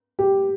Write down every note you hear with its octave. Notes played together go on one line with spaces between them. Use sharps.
G4